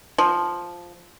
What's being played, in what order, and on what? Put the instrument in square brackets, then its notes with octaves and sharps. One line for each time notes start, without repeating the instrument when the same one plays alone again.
[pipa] F3